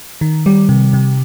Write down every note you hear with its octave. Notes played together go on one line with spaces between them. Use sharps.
D#3
G3
C3
C3